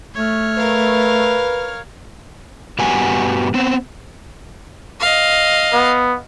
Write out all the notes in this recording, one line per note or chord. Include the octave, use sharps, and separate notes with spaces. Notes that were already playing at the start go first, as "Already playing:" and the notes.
A3 C#5 F6
A#4 B4 F5
G2 G3 B3 F#4 G#5
B3 C4
D#5 F5
B3